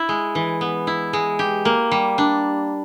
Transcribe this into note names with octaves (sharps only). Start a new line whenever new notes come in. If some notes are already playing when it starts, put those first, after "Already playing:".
Already playing: E4
G#3
E3
B3
E4
G#3
G4
A#3
G3
D4